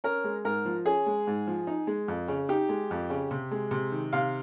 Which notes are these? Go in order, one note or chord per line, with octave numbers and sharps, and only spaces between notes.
C#4 A#4
G#3
G#2 A#4
F3
C#4 G#4
G#3
G#2
F3
D#4
G#3
F2
C#3
D#4 G4
G#3
F2
C#3
C3
G#3
C3
D#3
C3 F5